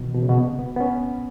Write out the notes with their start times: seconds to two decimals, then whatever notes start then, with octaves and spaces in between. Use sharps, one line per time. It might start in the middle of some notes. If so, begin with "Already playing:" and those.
Already playing: B2 D#3 E3
0.14 B2
0.22 C#3
0.29 B2
0.59 B3
0.76 B3
0.80 C#4